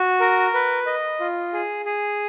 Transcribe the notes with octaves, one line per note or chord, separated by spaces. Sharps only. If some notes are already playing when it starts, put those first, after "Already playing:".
Already playing: F#4
A#4
B4
D#5
F4
G#4
G#4